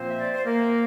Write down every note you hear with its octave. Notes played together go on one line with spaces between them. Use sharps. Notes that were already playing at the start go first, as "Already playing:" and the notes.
Already playing: A#2 F3 A#3 C4 C5
E5
D5
C5
A#3 A#4